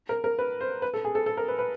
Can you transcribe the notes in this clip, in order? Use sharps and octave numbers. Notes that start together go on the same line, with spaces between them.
A#4
A#4
B4
C5
B4
A4
G#4
A4
A4
A#4
B4
B4